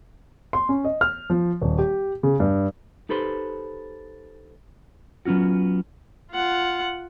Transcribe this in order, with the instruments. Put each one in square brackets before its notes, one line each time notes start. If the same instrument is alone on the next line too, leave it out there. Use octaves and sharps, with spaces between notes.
[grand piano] C6
C#4
D#5
F6
F3
D#1
G4
C#3
G2
[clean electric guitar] D#4 G4 A4 B4 C5 C6
F#3 B3 C#4 F4 F#4
[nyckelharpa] F4 F#5